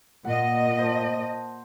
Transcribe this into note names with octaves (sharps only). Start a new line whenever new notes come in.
A#2 D#5 F#5
C5 A5